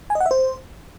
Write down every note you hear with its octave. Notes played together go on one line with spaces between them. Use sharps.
G#5
D#5
F#5
E5
C5